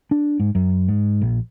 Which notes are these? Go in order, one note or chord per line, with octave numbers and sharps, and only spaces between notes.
D4
G#2
F#2
G#2
A#1